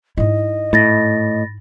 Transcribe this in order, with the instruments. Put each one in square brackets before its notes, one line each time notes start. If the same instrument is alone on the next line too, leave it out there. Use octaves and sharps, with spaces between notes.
[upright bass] G#2 E4 [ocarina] D#5
[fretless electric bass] A2 [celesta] B5 A6 A#6